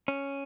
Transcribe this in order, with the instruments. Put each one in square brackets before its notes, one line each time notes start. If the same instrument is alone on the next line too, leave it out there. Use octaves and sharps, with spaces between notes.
[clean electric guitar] C#4